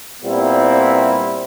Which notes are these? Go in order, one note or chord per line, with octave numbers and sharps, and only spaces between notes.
A#2 G3 B3 C4 E4